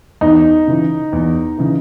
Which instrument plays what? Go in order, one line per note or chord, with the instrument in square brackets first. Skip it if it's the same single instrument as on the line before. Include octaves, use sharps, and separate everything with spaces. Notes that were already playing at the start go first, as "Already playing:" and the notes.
[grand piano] E2 [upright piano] D#4
[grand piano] C#3 E3
E2
C#3 E3